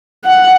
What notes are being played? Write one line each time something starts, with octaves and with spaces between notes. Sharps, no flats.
F#5